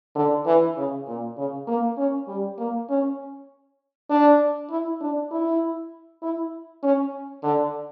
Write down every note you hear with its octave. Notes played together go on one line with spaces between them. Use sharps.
D3
E3
C#3
A#2
C#3
A#3
C#4
G3
A#3
C#4
D4
E4
D4
E4
E4
C#4
D3